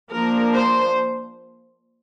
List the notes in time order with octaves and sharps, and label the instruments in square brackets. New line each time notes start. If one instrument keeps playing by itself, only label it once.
[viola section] F3 A#3 D4 A#4
C5